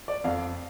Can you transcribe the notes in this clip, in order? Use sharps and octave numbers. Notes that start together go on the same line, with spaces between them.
D5
F2 F5